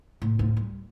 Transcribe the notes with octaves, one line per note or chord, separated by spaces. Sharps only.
A2
D2 A2
G3